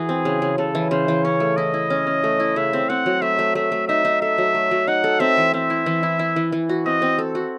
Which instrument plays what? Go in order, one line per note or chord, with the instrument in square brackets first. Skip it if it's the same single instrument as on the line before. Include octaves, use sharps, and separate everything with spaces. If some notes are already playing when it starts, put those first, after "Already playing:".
Already playing: [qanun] E3 F#4 [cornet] G#4
[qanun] C4
C#3
C#3
[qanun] C#3 [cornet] A4
[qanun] E3
[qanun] C#3 [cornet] C5
[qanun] E3
[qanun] C#4 [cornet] C#5
[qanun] A3
[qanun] E4 [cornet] D#5
[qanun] E4
C#4
C#4
A3
E4
[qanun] C#3 [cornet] E5
[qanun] C4
[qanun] C4 [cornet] F#5
[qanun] F#3
[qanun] A3 [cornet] E5
[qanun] A3
[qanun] A3 [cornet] E5
[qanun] A3
[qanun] D#4 [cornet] E5
[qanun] D#4
[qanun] A4 [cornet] E5
[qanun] F#3
A3
F#3
[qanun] D#4 [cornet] F#5
[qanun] A4
[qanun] C4 [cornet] E5
[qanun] E3
[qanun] C4 [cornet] E5
[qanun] E4
E3
E4
E4
E3
E3
F#4
[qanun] C4 [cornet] D#5
[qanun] C4
A4
F#4